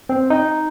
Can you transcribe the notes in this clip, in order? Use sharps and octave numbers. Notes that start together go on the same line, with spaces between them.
C4
D#4